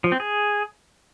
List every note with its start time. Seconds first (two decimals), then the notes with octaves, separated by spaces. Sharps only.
0.04 F3
0.12 C4
0.20 G#4